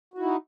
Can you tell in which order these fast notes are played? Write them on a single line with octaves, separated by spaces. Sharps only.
F#4 E4 D#4